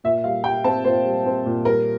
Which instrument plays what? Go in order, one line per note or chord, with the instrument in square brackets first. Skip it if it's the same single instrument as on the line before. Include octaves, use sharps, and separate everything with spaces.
[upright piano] A#2 E5
G3 F5
G3 G5
C4 A5
A#2 C5
G3
C4
A#2
G3 A#4